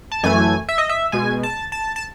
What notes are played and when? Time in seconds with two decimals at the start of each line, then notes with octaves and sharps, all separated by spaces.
0.12 A5
0.23 F#2 E3 A3 G#5
0.69 E5
0.78 D#5
0.89 E5
1.12 B2 G#3 G#5
1.43 A5
1.72 A5
1.96 A5